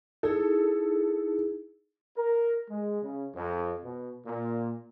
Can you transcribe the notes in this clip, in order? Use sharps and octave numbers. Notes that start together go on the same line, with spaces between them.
D#4 E4 G#4 A4
A#4
G#3
C#3
F2
B2
A#2